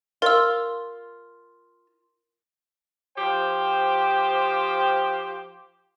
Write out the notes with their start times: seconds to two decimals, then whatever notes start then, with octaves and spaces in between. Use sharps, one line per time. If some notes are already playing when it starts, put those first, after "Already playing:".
0.22 F4 A#4 E6
3.17 F3 G4 C5 G5